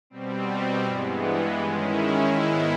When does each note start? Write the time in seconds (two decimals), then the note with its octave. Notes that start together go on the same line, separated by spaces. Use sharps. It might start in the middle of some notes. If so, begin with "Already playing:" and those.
0.10 B2 G3 C4
0.85 G2 E3 G#3 B3
1.61 D#3 G#3 C#4 E4
2.37 G#2 D#3 G#3 B3 E4